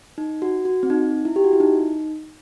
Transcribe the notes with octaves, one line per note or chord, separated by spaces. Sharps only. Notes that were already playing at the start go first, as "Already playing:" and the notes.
D#4
F#4
F#4
C4
D#4
E4
G4
F#4
E4
D#4